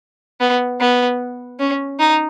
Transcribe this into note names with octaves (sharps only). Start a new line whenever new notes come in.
B3
B3
C#4
D#4